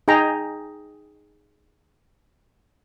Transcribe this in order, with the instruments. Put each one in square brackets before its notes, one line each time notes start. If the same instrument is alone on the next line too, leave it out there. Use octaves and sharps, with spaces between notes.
[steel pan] D#4 G#4 G5 A#5